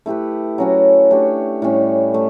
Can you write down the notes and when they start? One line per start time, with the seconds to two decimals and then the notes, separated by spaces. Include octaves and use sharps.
0.06 A3 E4 G4 B4
0.58 F#3 C#4 F#4
1.11 A3 D4 G4 C#5
1.62 A2 G3 C#4
2.14 A3